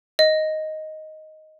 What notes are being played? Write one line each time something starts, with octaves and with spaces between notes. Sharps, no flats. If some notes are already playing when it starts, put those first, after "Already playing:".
D#5